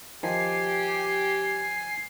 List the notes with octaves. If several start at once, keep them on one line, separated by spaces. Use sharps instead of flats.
D#3 F3 G4 G#5 C7